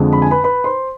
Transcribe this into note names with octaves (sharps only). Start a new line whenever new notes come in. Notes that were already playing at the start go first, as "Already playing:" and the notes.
Already playing: F2 D3 G#3
B5
G#5
B4 B5
B4 B5
C5 C6